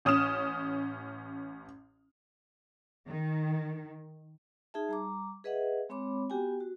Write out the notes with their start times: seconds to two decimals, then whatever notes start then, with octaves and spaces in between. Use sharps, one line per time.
0.05 A1 C#4 D#6 F6 E7
3.08 D#3
4.74 D#4 G#4 E5 A5
4.89 G3 A#5 D6
5.44 G#4 B4 D#5 E5 F#5
5.89 G#3 C4 C#5 B5 D6
6.30 B3 F#4 G4 G5 G#5
6.60 F#4